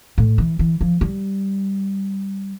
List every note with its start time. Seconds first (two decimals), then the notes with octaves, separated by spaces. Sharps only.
0.18 A2
0.38 E3
0.59 E3
0.81 F3
1.01 G3